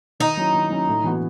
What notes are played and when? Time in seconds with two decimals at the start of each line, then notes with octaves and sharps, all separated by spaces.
0.20 D#3 D#4
0.37 F#3 C#4 E4
0.54 D#3
0.70 F#3 C#4 E4
0.88 A2
1.04 E3 B3 F#4